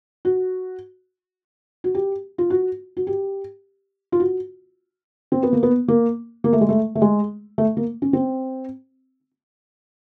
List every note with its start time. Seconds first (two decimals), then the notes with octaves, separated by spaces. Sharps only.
0.25 F#4
1.84 F#4
1.95 G4
2.38 F4
2.50 F#4
2.97 F#4
3.07 G4
4.12 F4
4.20 F#4
5.32 C4
5.43 B3
5.53 A#3
5.63 B3
5.88 A#3
6.44 A#3
6.53 A3
6.61 G#3
6.69 A3
6.95 A3
7.02 G#3
7.58 A3
7.77 A#3
8.02 C#4
8.13 C4